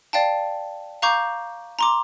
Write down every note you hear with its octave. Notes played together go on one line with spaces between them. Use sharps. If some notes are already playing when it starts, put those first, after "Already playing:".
D5 F5 G5 A5
F5 A#5 C#6 D6 G6
A#5 C6 D6